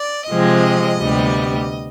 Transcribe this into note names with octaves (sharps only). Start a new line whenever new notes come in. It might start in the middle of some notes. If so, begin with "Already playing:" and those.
Already playing: D5
C3 F3 G#3 C4 D#5
D2 C3 G3 B3